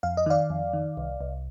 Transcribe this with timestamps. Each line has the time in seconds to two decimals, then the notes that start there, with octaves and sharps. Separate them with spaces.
0.03 F2 F5
0.17 D#5
0.26 D#3 D5 F5
0.50 F2
0.73 D#3
0.97 C2
1.21 C2